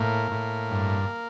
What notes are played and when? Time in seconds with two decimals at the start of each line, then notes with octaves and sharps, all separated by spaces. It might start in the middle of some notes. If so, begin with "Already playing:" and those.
Already playing: A2 A#3
0.31 A2
0.71 G2